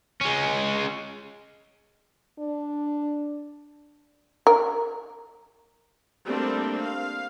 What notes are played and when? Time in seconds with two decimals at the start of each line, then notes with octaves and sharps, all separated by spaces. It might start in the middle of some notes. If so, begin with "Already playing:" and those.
0.21 G#3 C#4
2.39 D4
4.47 A#4
6.26 G3 A3 A#3 C4 D4 G4
6.81 F5